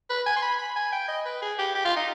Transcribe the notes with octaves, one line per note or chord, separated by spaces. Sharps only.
B4
G#5
C6
B5
B5
G#5
G5
D#5
B4
G#4
G4
G4
F4
D#4